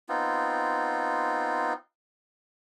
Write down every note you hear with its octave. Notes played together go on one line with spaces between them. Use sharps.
B3 C4 D#4 F4